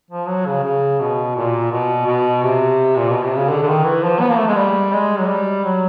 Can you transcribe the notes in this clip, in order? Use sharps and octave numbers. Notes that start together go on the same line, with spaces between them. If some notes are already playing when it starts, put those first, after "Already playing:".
F3
F#3
C#3
C#3
B2
A#2
B2
B2
C3
A#2
B2
C3
C#3
D3
D3
D#3
E3
F3
B3
A#3
A3
G#3
G3
G#3
F#3
G3
F#3